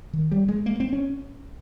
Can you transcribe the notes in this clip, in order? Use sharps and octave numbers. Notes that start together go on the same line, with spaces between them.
D#3
G3
G#3
A#3
C4
C#4